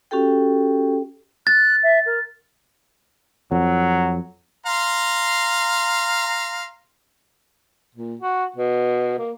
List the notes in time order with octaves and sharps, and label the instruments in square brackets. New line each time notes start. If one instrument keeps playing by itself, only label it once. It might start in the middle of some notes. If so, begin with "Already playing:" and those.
[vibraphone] C#4 F#4 G4 A4 G5
[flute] F#6 [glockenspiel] A6
[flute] E5
A#4
[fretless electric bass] F2 [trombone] F#3
[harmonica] F5 A#5 C6
[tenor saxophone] A#2
F#4
B2
A#3